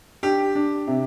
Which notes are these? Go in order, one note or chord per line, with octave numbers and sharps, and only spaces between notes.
D4 G4
D4
C3